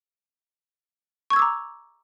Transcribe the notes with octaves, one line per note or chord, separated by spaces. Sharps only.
A#5 C#6 D6 E6 G#6